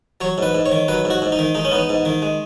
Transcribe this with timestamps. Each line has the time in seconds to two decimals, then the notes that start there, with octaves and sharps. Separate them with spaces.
0.21 F#3 C#5
0.38 G#2 B4
0.55 G#2
0.66 C#5
0.72 D#3
0.88 F#3 B4
1.05 G#2
1.10 F#4
1.22 G#2
1.32 D#4
1.39 D#3
1.55 G#3 D#4
1.65 C#4
1.72 B3 D#4
1.89 G#2
2.05 D#3
2.22 G#3